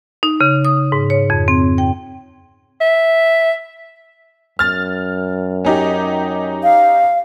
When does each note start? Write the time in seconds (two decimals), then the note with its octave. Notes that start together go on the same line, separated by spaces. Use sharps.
0.23 D#4
0.41 C#3
0.65 D#6
0.92 G#2
1.10 C#5
1.30 F2
1.48 C4
1.78 G5
2.81 E5
4.59 F#2 F6 A6
5.65 C#4 D#4 G4
6.63 F5